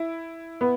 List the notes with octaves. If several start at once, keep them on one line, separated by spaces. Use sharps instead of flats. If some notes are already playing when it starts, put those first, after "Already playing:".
Already playing: E4
B3